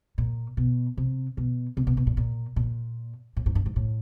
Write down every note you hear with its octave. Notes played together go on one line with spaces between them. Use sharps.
A#2
B2
C3
B2
C3
B2
B2
A#2
A#2
A#2
A2
G#2
G2
G#2
A2